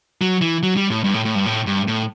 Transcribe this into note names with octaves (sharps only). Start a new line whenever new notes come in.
F#3
E3
F#3
G3
A2
G2
A2
A2
G2
A2
G2
A2